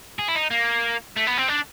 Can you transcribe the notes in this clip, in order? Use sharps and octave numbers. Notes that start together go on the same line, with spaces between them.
G#4
E4
D#4
A#3
A3
B3
C4
D4